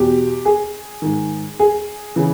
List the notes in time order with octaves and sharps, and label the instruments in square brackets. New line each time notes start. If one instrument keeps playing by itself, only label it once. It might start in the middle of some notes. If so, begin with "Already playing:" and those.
Already playing: [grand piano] E2 B2 G4
G#4
G#2 D#3
G#4
C#3 E3